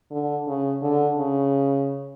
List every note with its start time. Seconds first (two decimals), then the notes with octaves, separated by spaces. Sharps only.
0.11 D3
0.47 C#3
0.82 D3
1.18 C#3